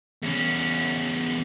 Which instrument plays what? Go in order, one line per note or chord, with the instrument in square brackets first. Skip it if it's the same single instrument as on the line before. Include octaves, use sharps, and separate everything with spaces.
[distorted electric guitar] E2 C#4